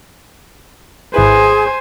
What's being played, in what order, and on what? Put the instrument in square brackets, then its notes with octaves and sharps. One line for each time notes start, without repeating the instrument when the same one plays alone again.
[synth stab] G#1 E4 B4 [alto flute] G#4 [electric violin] C5 G#5